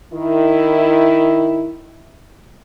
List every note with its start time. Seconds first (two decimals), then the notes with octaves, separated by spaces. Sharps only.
0.12 D#3 E4